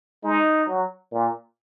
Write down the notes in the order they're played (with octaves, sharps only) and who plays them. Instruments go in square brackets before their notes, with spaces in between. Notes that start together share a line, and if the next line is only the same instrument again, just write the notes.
[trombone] G#3 [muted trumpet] D#4
[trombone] F#3
A#2